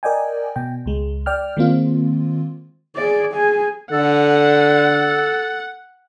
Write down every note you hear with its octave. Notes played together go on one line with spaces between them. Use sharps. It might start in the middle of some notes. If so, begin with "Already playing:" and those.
A#4 D5 D#5 G5 G#5
B2 G5
C#2 G#3
D5 G5 F6
D#3 G#3 A#3 C4 F4
G#4 D5
G#4 G#5
D3 A4 F#5